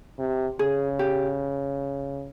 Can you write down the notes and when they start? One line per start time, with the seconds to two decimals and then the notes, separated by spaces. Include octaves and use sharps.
0.19 C3
0.59 C#3 G#4
0.99 G4